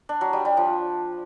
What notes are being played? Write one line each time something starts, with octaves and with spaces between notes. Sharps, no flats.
D4
F#3
G3
G3
F3